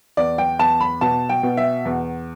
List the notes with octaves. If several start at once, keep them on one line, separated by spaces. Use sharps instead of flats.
E2 D5
G5
E2 A5
B5
B2 A5
G5
B2
E5
E2